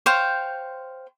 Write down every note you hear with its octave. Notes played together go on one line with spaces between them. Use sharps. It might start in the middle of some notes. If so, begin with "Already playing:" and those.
C5 C#5 F5 G5